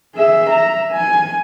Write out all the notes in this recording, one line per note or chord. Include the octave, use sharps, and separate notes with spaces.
G#4 E5
E5 A#5
G#5